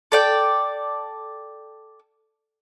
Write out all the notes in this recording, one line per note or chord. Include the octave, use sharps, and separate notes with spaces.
A4 D5 G5